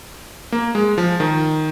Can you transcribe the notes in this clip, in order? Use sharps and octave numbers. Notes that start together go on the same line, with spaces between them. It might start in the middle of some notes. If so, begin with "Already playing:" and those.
A#3
G#3
F3
D#3